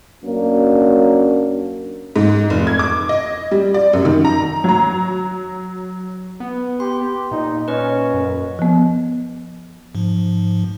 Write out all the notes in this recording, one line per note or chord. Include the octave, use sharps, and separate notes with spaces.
F#2 F#3 A#3 C#4 D4
G#2
F1
G#6
D6
D#5
G3
D5
F#2
D#3
A#5
F#3 A#5
B3
G4 C6
A#2 D#4
C#4 B4 D#5
F#2
F3 B3
G#2 F3